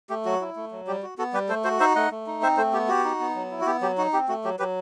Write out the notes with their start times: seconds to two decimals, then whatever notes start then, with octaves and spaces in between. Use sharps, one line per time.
0.09 A3 G4
0.25 F#3 F#4
0.40 E4
0.56 A3
0.71 F#3
0.87 G3 G4
1.03 F#4
1.18 B3 F#4 A4
1.33 G3 G4 B4
1.48 A3 A4 C5
1.64 F#4 A4 C5
1.80 D#4 C5 E5
1.95 A3 D#5 F#5
2.11 A3
2.27 D#4
2.42 C4 C5 E5
2.57 A3 A4 C5
2.73 B3 G4
2.88 F#4 G4
3.04 D#4
3.20 B3
3.35 F#3
3.51 E4
3.61 F#4
3.66 B3 G4
3.81 F#3 G4
3.98 D#4 F#4
4.13 C4 G4
4.28 A3 F#4
4.44 F#3 G4
4.59 F#3 G4 B4